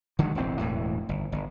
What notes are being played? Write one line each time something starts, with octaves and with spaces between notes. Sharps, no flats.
D3 D#3 F#3 G#3
E1 A1 C4
E1 D2 A2 E3
G1
G1